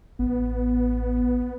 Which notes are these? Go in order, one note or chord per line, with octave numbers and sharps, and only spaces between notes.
A1 B3